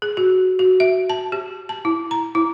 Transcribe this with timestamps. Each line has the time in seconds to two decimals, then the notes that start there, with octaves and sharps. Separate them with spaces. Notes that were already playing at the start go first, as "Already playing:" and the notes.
0.02 G#4
0.17 F#4
0.59 F#4
0.80 E5
1.10 A5
1.32 G4
1.69 A5
1.85 E4
2.11 A#5
2.35 E4